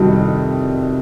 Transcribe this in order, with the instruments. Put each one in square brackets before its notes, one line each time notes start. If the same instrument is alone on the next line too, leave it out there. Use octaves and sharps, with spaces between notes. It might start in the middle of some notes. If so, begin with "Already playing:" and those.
Already playing: [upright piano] F2 C3 D#3 G3 F#4